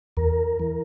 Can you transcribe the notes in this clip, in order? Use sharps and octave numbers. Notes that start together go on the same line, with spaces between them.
E2 A#4
E3